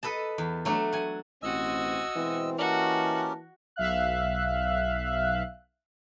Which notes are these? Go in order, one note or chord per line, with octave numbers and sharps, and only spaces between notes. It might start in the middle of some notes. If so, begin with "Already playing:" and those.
A4 B4 D#5 A5
E2
F#3 A3 D4
F#5 G#5
A1 B2 C4 F#4 D#5 G#5 E6
B2 E3 G#3 C4
A#3 C#4 F#4 G4 A#4 D#5 A5
B1 E5 F5 F#6